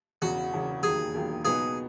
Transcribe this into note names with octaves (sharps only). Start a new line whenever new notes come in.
E1 E2 C#3 F#4
E1 E2 C#3
E1 D#2 D#3 F#3 G#4
E1 D#2 D#3 F#3
C#2 B2 F#3 B3 D#4 G#4